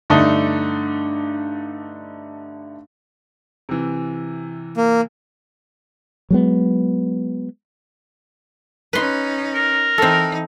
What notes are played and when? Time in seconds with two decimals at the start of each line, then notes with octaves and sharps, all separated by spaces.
0.10 G2 D3 A3 D4 D#4
3.69 C3 E3
4.77 A#3
6.30 F#3 G#3 B3
8.93 C#4 D#4 B4 C6
9.54 A#4
9.98 E3 C4 D#4 A4